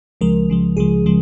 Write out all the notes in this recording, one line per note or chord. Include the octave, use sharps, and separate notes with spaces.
C#2 C#3 F3 G#3 A#4
C#2 C#3 F3 G#3
C#2 C#3 F3 G#3 G#4
C#3 F3 G#3